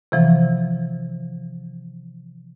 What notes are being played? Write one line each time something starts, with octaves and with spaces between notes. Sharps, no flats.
C3 E3 F3